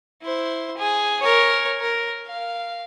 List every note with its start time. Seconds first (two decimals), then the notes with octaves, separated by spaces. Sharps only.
0.22 E4 C5
0.77 G#4
1.20 A#4 C#5
1.80 A#4
2.26 F5